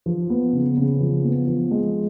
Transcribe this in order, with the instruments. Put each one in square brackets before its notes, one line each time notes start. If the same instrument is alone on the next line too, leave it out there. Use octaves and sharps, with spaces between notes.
[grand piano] F3
B3
C#3
C#3
F3
B3
F3
G#3